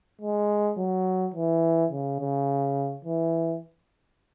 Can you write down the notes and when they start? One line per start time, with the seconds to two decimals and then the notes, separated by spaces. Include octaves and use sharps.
0.21 G#3
0.78 F#3
1.34 E3
1.91 C#3
2.20 C#3
3.05 E3